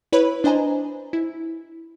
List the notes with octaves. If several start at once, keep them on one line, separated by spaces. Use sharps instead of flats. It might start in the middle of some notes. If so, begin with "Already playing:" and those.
E4 B4 C#5 B5
D4 C5 D#5 G#5 A#5
E4